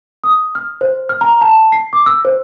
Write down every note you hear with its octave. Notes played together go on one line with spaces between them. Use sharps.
D#6
F6
C5
F6
A#5
A5
C7
D6
E6
C5